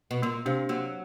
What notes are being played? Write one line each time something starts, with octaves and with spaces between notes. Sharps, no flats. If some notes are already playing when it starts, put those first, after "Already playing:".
B2
A#2 A#3
C3 D4 G4 C5 F5
F#3 A#3